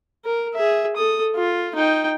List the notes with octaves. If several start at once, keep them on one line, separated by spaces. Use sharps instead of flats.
A#4
G#4 E5
A4 D#6
F4
D#4 G5